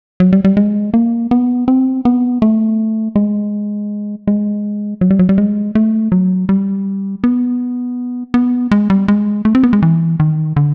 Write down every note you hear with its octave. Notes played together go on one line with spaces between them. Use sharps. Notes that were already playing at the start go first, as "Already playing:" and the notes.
F#3
G3
G3
G#3
A#3
B3
C4
B3
A3
G#3
G#3
F#3
G3
F#3
G3
G#3
A3
F#3
G3
B3
B3
G#3
G3
G#3
A3
C4
B3
G#3
E3
D#3
D3